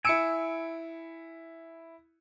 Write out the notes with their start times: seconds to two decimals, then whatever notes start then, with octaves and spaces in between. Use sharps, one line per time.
0.05 E4 G#5 E6 C#7 D7